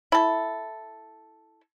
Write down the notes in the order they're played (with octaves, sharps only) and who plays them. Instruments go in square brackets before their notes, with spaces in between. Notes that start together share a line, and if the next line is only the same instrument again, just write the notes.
[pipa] E4 A4